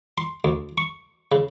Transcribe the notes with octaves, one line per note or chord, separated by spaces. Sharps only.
C6
D2
C#6
C#3